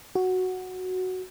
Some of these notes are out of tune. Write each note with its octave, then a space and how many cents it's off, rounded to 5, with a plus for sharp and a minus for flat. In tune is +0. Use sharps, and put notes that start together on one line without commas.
F#4 +0